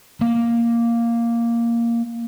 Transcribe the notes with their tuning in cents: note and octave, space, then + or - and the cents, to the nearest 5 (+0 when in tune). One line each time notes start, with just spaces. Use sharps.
A#3 +0